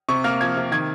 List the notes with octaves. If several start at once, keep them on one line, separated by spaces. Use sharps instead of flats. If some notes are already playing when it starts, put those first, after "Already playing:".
C3 C#6
A#3 F6
F3 G#6
C3
D#3 G#6